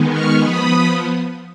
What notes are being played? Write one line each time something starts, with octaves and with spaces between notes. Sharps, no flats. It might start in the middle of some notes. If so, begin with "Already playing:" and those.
Already playing: D#3 G#3 B3
C#6 F6
F3 B3 B5 D#6